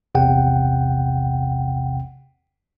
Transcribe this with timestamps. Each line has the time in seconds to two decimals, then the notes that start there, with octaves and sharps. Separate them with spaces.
0.15 A#1 E2 C3 F#5 G5